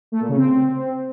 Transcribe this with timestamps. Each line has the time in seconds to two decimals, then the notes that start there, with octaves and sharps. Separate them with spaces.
0.12 A3
0.20 A#2
0.29 C#3
0.37 C4